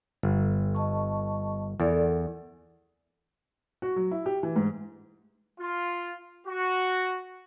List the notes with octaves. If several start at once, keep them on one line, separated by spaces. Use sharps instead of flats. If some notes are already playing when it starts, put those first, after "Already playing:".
G1
D#5 A5 C#6
E2 A4 A#4 D5
F#4
F#3
E4
G4
E3
G#2
F4
F#4